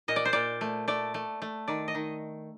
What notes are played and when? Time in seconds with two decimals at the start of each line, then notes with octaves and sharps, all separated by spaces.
0.08 A#2 D#5
0.16 D5
0.25 C5
0.33 A#2 D5
0.61 A3
0.88 A3 D5
1.14 A3
1.42 A3
1.68 D#3 D5
1.88 D#5
1.95 D#3